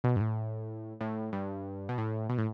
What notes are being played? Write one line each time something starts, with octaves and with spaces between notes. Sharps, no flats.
B2
G2
A2
A2
G2
B2
A2
B2
A2